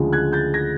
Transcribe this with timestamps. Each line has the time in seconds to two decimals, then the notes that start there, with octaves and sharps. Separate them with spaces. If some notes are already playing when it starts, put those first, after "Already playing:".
Already playing: D2 C#3 F3 G#3
0.12 F#6 G#6
0.33 G6 A6
0.54 G#6 A#6